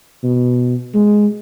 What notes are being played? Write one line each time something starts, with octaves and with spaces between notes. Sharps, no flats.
B2
G#3